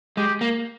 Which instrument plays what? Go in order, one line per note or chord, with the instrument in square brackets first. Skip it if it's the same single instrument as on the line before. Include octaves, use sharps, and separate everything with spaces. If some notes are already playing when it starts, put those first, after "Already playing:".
[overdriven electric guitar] G#3 [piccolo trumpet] G4
[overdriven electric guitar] A#3